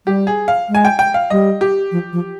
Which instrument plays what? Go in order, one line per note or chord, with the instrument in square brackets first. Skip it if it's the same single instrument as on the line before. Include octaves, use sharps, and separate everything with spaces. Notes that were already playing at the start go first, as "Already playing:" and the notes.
[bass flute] G3 [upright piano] G4
[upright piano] G#4
F5
[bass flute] G#3
[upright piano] G#5
G5
G5
F5
[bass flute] G3 [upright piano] D#5
[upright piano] G4
[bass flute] F3
F3